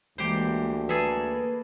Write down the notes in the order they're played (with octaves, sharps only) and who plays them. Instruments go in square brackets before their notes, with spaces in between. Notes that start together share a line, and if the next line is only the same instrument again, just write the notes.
[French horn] D2 [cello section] E3 G#3 A#3 [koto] G4 C5
[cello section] A#3 [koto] G#4 A4 E5 [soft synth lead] B4